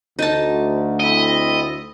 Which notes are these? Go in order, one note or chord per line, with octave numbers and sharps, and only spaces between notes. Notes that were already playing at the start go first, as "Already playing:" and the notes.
D2 D#4 A5
C4 E4 A4 D#5